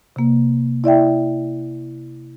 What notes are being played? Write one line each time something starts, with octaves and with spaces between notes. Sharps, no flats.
C3 A#3
E4 D5 E5 G5